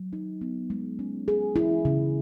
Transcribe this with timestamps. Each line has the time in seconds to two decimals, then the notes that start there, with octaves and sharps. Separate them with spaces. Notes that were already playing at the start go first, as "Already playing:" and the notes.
Already playing: F#3
0.13 D#4
0.41 B3
0.70 G#3
0.99 C#4
1.28 G#4
1.56 E4
1.85 C#3